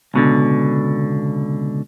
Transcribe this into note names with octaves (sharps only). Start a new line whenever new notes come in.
C#2 B2 D3